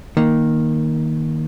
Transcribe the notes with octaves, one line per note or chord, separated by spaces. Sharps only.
D#3 A#3